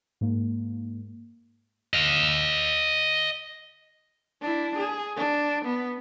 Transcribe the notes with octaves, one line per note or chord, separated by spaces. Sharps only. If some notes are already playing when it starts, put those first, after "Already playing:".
G#2 A#3
D#5 F5
D4 E4
G#4
D4
B3